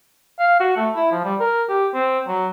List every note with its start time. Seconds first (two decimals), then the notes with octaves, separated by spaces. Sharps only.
0.39 F5
0.60 F#4
0.76 A3
0.95 E4
1.12 F3
1.24 G3
1.40 A#4
1.69 G4
1.94 C4
2.27 F#3